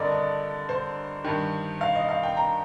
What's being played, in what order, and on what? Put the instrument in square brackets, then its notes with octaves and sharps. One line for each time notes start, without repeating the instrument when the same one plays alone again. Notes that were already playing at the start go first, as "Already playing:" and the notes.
Already playing: [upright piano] G2 D3 A#4 D5 D#5
D#5
C5
G2 D#3
F5
D#5
F5
G5
A#5